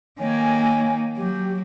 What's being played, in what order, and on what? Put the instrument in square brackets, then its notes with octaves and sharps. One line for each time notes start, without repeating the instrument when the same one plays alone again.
[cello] D#3 A#3 [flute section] C#5 G#5
[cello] F#3 [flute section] G4